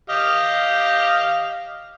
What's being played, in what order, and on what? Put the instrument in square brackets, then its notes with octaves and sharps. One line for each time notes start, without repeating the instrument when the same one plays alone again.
[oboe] G4 [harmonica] D#5 F5